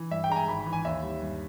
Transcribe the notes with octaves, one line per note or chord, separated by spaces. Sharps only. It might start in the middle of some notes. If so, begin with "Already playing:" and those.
Already playing: E3
G2 E5
G5
G#3 A#5
G#5
G#1 B5
B5
E3
G#5
D#2 E5
G3
G2